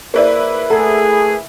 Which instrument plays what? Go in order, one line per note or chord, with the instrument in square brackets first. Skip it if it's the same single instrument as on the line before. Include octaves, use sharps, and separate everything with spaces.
[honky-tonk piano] A#3 E4 B4 [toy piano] G#4 C5 D5
[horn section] A3 G#4 [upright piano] A4 [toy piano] F#5 A#5